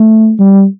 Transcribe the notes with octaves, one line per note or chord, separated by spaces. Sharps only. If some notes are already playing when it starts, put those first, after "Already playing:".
Already playing: A3
G3